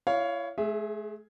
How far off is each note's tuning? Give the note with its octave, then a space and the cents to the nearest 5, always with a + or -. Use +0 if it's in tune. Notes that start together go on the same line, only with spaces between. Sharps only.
E4 +35 C#5 +15 F5 +0
A3 -45 G#4 +0 E5 +0